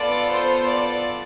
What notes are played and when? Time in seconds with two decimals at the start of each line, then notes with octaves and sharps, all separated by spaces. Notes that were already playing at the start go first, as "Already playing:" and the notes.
Already playing: B3 F4 A4 D5
0.31 C5
0.67 D5